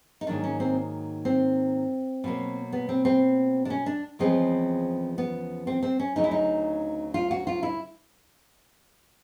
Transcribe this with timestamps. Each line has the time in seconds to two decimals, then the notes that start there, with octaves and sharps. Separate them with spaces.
0.21 D#4
0.27 G#2 D#3 F#3 A#3 D4
0.44 C#4
0.60 C4
1.25 C4
2.24 B2 F#3 A#3
2.72 B3
2.89 C4
3.05 C4
3.65 D4
3.70 C#4
3.86 D4
4.19 E2 C#3 F3 G#3 B3 C4
5.18 B3
5.67 C4
5.83 C4
5.99 C#4
6.16 D2 C#3 F#3 D#4
6.24 E4
6.31 D#4
7.14 F4
7.31 F#4
7.47 F4
7.63 E4